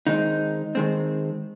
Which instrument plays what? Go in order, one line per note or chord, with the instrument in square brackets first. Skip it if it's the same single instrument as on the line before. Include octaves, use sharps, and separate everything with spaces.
[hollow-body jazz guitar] D#3 G#3 C4 D#4
D#3 G#3 C4